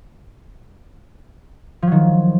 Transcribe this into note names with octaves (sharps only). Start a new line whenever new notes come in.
D#3 F3 F#3